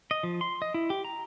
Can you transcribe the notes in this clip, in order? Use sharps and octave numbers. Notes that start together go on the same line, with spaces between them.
D#5
F3
C6
D#5
E4
G4
A#5